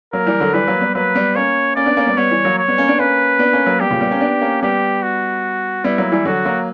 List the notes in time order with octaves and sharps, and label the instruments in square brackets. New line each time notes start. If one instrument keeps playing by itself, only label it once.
[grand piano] F#3 A#3 [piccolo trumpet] A#4
[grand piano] E3 G3
D3 F#3
[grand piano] E3 G3 [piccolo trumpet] B4
[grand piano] F#3 A#3
G3 B3
[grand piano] F#3 A#3 [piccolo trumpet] B4
[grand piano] G3 B3
[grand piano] A#3 C#4 [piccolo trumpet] C#5
[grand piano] A#3 C#4 [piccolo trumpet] D5
[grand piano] B3 D4
A#3 C#4
G3 B3
[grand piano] G3 B3 [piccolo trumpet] C#5
[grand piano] E3 G3
F#3 A#3
[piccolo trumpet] C#5
[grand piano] G3 B3
A#3 C#4
B3 D4
[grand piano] A#3 C#4 [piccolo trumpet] B4
[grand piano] B3 D4
A#3 C#4
F#3 A#3
[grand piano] G3 B3 [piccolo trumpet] G4
[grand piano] A#2 C#3
G3 B3
A#3 C#4
B3 D4
A#3 C#4
[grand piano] G3 B3 [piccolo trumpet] G4
[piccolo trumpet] F#4
[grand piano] G3 B3 [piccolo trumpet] E4
[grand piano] F#3 A#3
E3 G3
[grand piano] D3 F#3 [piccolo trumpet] F#4
[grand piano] F#3 A#3